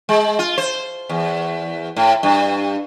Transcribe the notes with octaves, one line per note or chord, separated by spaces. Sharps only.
G#3
F4
C5
E2
A2
G2